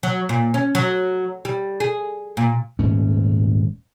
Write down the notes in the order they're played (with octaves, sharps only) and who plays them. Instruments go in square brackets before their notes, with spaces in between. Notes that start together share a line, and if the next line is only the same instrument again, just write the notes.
[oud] F#3
A#2
C#4
F#3
G3
G#4
A#2
[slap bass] D#1 G#2 A3 C#4